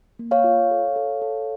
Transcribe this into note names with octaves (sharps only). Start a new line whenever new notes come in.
A#3
C#5 F5
F4
A4
A4
A4